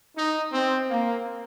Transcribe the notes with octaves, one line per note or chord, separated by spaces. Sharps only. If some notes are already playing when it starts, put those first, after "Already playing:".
D#4
C4
A#3